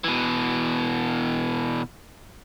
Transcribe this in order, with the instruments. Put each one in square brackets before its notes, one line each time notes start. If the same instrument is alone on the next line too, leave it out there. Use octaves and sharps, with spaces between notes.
[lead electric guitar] B2 E3